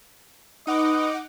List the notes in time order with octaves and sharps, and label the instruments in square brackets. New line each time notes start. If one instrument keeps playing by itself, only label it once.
[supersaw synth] D#4 F#5 D6 [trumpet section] B4 D#5